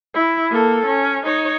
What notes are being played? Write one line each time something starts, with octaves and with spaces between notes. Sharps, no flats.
E4
A#3 A4
C#4
D#4 C#5